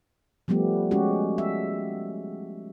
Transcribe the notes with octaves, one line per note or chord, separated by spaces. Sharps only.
F3 G3 A3 B3 G4
G#3 C#4 F#4 G4
E5